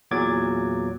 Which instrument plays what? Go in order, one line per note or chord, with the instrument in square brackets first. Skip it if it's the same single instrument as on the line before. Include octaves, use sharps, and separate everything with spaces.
[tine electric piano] E2 A#2 F#3 D6 G#6 A6